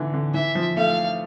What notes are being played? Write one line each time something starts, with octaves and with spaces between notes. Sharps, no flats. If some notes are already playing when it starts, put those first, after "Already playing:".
Already playing: D3 E3
D3
E3 E5
F3
A3 F5